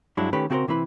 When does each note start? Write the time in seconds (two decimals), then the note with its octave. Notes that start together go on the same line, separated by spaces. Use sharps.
0.17 G2 F#3 G#3 D4 E4
0.33 D#3 A3 C#4 G4 B4
0.50 C#3 C4 F#4 G#4 A#4 C5
0.68 C3 E3 C4 E4 B4